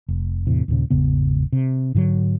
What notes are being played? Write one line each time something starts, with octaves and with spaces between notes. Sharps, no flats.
F1
E2 A2 C3
D#2 A#2 C#3
G#1 E2 C#3 B3
C3
G#2 D3 D#3 F#3